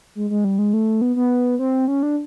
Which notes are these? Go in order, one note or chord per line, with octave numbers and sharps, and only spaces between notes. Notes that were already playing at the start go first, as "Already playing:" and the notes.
G#3
G#3
G3
G#3
A3
B3
B3
C4
C#4
D4